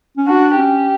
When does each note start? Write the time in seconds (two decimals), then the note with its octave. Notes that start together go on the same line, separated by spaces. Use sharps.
0.17 C#4
0.27 D4 F#4
0.58 C#4 G4